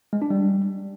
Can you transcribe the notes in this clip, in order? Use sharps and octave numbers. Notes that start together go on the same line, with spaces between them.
G#3
D4
G3